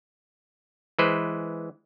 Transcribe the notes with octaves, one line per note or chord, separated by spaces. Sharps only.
E3 G#3 B4 C5